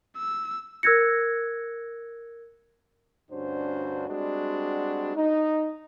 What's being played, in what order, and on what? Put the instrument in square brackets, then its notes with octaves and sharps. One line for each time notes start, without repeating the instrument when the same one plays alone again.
[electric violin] E6
[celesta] A#4 E6 F#6 G#6 A#6 C#7
[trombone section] D2 G2 C#4 D4 F#4 C5
G3 G#3 C4 D4 F#4
D#4